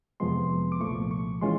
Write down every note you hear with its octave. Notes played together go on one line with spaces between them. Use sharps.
F2 C3 F3 G#3 B3 C6
D6
C2 A#2 F3 A3 C#6
C#6
E3 G#3 C#4 F4 C6